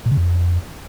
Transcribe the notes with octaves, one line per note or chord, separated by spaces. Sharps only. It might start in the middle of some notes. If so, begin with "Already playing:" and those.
A#2
C#3
F2